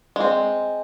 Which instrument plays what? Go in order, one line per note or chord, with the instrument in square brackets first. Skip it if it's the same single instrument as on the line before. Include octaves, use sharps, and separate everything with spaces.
[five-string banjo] G#3 C4